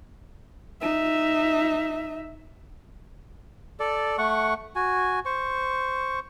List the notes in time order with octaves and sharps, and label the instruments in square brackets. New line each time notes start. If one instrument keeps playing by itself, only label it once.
[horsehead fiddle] D#4 E5
[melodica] A4 D5
A3 F#5 C#6
F#4 G#5
C5 C#6